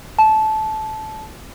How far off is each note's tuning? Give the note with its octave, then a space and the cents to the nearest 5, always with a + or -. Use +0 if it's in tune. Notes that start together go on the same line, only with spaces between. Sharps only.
A5 -20